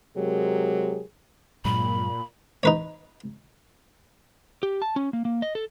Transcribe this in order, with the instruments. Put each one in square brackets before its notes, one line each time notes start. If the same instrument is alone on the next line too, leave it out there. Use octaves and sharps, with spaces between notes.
[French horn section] C3 F#3 G#3 G4 G#4 A#4
[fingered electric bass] G2 F#3 G#3 [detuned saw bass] A#2 [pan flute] B5
[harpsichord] D#4 B4 C#5
[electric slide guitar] G4
A5
C#4
A#3
A#3
D#5
A4